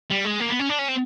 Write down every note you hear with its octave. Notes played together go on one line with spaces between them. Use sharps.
G3
G#3
A#3
B3
C#4
D4
C#4
C4